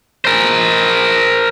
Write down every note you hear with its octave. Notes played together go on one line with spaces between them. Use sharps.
A#4 C5